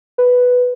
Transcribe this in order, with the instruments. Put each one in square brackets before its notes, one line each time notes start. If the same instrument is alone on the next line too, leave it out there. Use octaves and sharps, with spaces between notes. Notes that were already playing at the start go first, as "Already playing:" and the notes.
[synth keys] B4